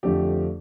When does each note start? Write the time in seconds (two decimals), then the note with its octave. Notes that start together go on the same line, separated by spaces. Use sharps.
0.03 F2 D3 F3 A3 G4